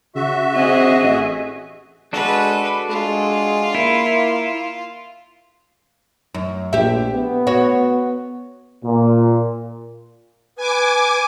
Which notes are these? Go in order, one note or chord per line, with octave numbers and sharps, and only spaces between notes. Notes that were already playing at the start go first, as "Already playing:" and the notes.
C#3 F#4 E5
C4 G#4 D#5
A1
G#3 D4 F#4 A4 B4
G#3 F4
A#3 E4
F#2
A#1 G4 E5
B3
F#4 C#5
A#2
B4 G#5 D6